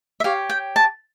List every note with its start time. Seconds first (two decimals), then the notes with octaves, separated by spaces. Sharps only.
0.20 E5
0.24 G4 C#5 F5
0.50 G5
0.76 A5